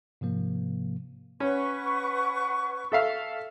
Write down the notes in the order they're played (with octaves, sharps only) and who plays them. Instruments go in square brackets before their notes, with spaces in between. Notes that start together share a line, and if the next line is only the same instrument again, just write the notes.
[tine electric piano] G#2 C3 F3 A#3
[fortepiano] C#4 [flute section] B4 F#5 C#6
[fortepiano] A4 E5 F5